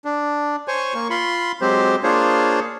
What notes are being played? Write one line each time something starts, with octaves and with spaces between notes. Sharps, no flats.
D4
C5 C#5 G#5 C#6
A#3 C#6
F4 B5 C6
F#3 G#3 C4 G4 C5
A#3 D4 F4 G#4 C5 C#5